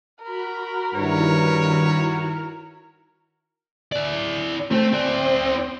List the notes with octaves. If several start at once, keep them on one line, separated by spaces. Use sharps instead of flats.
F#4 A#4 B5
G2 D#3 E4 F#4 B4 C#5
E4 D5
A3 C4
E4 D5